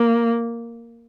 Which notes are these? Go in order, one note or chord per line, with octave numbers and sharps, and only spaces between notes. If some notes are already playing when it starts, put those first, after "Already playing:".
Already playing: A#3